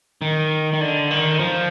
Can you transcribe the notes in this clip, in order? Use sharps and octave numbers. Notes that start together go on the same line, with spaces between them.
D#3
D#3
D3
D#3
F3